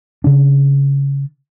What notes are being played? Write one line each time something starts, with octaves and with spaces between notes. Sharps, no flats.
C#3 D4